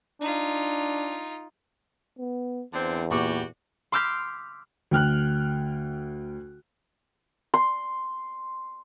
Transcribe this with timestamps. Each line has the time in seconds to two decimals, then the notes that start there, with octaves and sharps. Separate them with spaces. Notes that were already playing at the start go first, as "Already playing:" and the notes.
0.21 D4 D#4 F4
2.19 B3
2.74 E2 D3 C4
3.11 A#2 G3 F#4 G4 C#6 D6
3.92 C6 D6 E6 F6 G6 B6
4.91 D2 G5 F6 F#6
7.54 C6